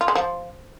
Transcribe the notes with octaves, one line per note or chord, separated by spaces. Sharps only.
F4
G#3
F3